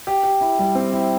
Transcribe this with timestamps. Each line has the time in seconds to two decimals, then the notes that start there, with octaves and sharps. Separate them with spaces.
0.07 G4
0.24 G4
0.41 E4
0.59 G3
0.75 C4
0.92 E4